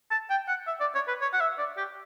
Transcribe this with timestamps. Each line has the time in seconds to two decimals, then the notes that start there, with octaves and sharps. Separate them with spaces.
0.11 A5
0.30 G5
0.48 F#5
0.67 E5
0.80 D5
0.95 C#5
1.08 B4
1.22 C#5
1.33 F#5
1.40 E5
1.58 D5
1.77 G4